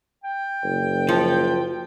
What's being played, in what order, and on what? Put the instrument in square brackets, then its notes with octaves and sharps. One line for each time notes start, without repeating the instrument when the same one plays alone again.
[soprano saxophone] G5
[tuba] F#1
[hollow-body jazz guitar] F3